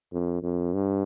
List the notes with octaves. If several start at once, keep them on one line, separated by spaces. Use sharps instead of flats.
F2
F2
G2